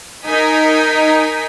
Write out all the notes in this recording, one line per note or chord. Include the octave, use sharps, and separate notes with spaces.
D#4 A#4 D#5 G#5 B6